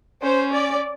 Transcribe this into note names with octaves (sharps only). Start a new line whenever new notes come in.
C#4 C5
D5